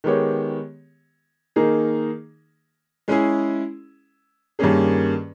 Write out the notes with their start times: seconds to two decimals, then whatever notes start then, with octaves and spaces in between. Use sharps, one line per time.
0.04 D#3 G#3 B3 G4 C#5
1.56 D#3 A#3 D#4 G#4
3.08 G#3 C#4 E4 G#4
4.59 G2 D#3 A#3 C#4 G#4